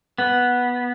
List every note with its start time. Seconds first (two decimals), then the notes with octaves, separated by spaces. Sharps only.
0.18 B3